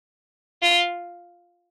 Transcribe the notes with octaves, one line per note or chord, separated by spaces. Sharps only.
F4